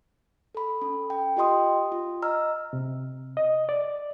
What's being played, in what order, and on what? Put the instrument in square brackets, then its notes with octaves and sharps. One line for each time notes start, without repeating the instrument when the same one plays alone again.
[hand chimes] A4 B5
C#4 A4
G5
F4 G4 D#5 G5 C6 D#6
F4
D#5 A#5 E6 F6
[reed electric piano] C3
D#5
D5